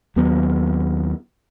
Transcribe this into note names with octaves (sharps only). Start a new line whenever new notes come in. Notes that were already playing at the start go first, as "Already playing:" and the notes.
D#2 F#3 B3